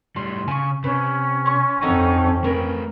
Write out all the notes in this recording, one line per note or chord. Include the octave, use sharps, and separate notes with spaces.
A2 G3 C6
C#3 G#5 C#6
C3 C#4 B4
C6 C#6
F2 C4 D#4 F#4 A4 A#5
A3 A#4 B4